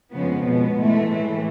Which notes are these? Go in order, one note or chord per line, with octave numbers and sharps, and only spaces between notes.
F2 C#3 F3 G#3 B3
B2 G#3 B3
G#2 E3 G#3 A3
A2 E3 A3